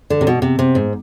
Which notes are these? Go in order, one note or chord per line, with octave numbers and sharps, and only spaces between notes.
D3
C3
B2
C3
C3
G#2